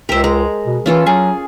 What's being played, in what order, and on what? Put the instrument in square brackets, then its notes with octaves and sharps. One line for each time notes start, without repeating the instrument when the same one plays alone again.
[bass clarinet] C#2 [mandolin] G4 E5 [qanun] A#4 C5
[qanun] G#3 [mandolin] A#5
[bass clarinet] B2
[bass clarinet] E3 [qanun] C#4 F4 A4 [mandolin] F5
[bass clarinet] F#3 [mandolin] G#4